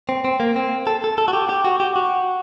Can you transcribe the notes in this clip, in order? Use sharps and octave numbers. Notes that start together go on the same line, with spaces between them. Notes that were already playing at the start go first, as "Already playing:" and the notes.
C4
C4
A#3
C4
A4
A4
A4
F#4
G4
G4
F#4
G4
F#4